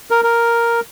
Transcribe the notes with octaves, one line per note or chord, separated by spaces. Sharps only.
A#4
A#4